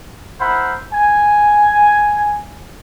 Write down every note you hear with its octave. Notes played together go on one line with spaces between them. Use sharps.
E4 A#4 C5 F#5 B5
G#5